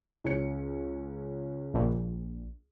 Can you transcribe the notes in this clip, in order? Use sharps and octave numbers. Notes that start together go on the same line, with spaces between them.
C#2 C#4 C#7
A#1